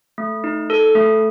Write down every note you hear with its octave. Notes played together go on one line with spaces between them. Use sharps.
A3
D#4
A4
A3